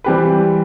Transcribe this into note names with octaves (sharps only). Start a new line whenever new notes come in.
E3 G3 C4 G4 B4